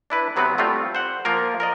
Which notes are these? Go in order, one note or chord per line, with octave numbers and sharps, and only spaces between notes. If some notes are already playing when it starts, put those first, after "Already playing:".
D4 E4 B4
C3 F#3 B3 C4 B4
G3 A3 C4 F4
C5 F#5
F3 A#3 F4 A#4
A#4 D5 D#5